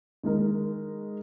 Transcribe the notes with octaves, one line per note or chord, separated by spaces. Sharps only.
D#3 G#3 D#4 A#4